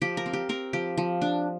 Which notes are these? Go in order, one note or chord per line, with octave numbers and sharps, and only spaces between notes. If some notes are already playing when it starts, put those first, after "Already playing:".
F3 G4
A#4
C4
G4
C4 A#4
F3 G4
F3
D4